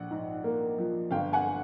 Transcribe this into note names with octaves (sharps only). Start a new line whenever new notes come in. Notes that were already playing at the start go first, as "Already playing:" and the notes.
Already playing: A#1 F#5
G#2
A#3
F3
G1 F5 G5
F#5 G#5